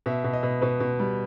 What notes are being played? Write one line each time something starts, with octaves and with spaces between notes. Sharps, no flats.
B2 E5
B2
D#5
B2
B2 B4
B2
G3